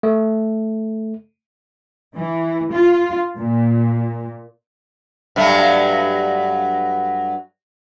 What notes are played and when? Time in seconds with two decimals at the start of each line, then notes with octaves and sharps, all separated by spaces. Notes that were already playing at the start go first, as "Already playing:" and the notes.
0.03 A3
2.15 E3
2.72 F4
3.38 A#2
5.36 G2 F#3 A3